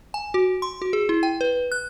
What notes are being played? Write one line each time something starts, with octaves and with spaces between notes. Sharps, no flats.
G#5
F#4
C6
F#4
G#4
E4
G5
B4
F#6